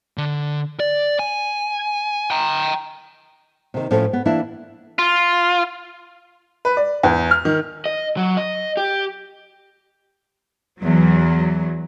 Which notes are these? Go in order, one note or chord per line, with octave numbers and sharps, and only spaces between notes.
D3
D5
G#5
G5 A#5
C3 D#3
A2 F3 C#4 A4
B3
E3 A#3 D4 E4
F4
B4
D5
E2
F6
D#3
D#5
F#3
D#5
G4
E2 F#3